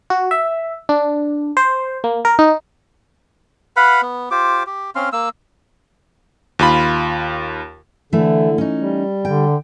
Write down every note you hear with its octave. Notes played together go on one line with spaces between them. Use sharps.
F#4
E5
D4
C5
A#3
A#4
D#4
B4 F5 F#5 B5
B3
F4 G4 C5 D6
G4
C4 C#4 F5 C6
A#3 E6
D#2 F4 B5
D3 E3 A3
C#4 D#4
G3
D3 G5